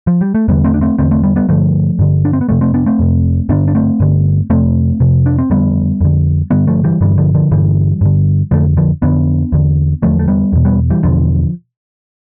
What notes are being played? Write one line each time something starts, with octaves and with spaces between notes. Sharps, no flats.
F3
G3
A3
E2 D3 G3 B3
A3 C4
D4
A3 C4
E2 D3 A3 C4
A3 C4
G3 B3
G3 B3
G2 D3 F3 A3
G2 D3
D4
C4
B3
F2 C3 F3 A3
A3 C4
B3 D4
A3 C4
F2 C3
G2 D3 B3 D4
D4
A3 C4
G2 D3
F2 C3 A3 C4
F2 C3
D4
C4
F2 D3 G3 B3
F2 D3
G2 D3 G3 B3
F3 A3
E3 G3
G2 D3 E3 G3
D3 F3
D3 F3
G2 D3 E3 G3
G2 D3
F2 D3 F3 A3
D3 F3
F2 D3 B3 D4
E2 D3
E2 D3 F3 A3
A3
G3 B3
E2 B2
G3 B3
E3 G3
E2 B2 D3 F3